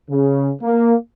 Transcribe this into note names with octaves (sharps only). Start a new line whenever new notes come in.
C#3
A#3